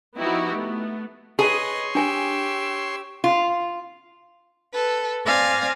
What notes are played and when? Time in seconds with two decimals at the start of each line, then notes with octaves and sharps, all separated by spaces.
0.18 F3 B3 D#4 E4 F#4 G4
0.52 A3 B3
1.39 G#4 B4 C#5 D#5 C6
1.95 D4 G4 G#5 E6
3.24 F4
4.73 A4 B4
5.26 C4 D5 F5 G#5 A#6